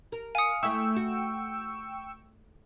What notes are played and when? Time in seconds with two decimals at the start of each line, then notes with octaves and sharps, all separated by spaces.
0.12 A#4
0.35 F5 G#5 D#6 C#7
0.63 A3 E4 G5 C#6 E6
0.96 F#4